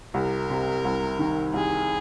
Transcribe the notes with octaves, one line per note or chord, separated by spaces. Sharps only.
C2 A#4
C3
C2
D#3
C2 G#4